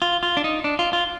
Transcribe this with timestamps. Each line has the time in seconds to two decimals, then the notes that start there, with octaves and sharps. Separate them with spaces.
0.02 F4
0.23 F4
0.37 D4
0.44 D#4
0.64 D4
0.79 F4
0.93 F4